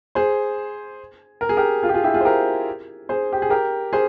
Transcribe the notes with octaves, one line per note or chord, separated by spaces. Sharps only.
G#4 C5
A#4
G#4
G4 A#4
F4 G#4
G4
F4 G#4
E4 G4
F4 G#4
C5
G4 A#4
G#4 C5
G4
G#4
G4 A#4
G#4 C5